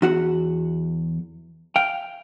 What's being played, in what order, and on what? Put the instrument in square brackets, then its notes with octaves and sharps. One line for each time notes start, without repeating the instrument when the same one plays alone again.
[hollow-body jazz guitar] E2 F#4 F#5
F5 G5